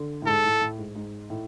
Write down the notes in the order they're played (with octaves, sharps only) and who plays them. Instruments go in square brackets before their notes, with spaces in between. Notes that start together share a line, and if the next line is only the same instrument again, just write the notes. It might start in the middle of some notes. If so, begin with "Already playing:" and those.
Already playing: [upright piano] D3
A2
[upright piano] G#2 [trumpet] A4
[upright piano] A2
A2
G#2
G#2
A2